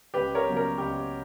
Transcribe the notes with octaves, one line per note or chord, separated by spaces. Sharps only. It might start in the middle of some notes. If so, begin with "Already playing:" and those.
C#2 G4 B4
A#4 C#5
C#3 F#3 B3
A#4
C#2 G4